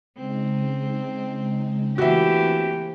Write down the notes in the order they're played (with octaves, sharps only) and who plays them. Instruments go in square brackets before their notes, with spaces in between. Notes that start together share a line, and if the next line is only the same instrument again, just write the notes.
[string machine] C#3 G#3 D#4 [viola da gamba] C4
[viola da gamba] E3 A3 A#3 [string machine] C4 [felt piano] F#4 E5 [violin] G4